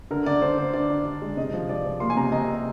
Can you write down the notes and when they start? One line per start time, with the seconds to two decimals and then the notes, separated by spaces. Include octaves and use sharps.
0.11 D3 A#4
0.26 D3 D5
0.42 D3 C5
0.58 D3 C5
0.73 D4 D5
0.90 D4
1.05 D4
1.22 G#3
1.37 C3 D#5
1.54 F3
1.69 F3 D5
1.86 F3
2.00 A#3 C6
2.10 G#5
2.17 C3 A#5
2.32 C3 D#5